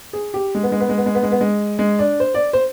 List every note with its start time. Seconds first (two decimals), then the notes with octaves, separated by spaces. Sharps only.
0.13 G#4
0.34 G4
0.55 G#3
0.63 B3
0.72 G#3
0.80 B3
0.89 G#3
0.98 B3
1.06 G#3
1.15 B3
1.23 G#3
1.32 B3
1.41 G#3
1.79 G#3
1.99 D4
2.20 C5
2.34 D5
2.53 C5